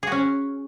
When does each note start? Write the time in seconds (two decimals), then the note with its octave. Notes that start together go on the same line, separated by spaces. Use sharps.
0.03 G#4
0.07 F#4
0.12 C#4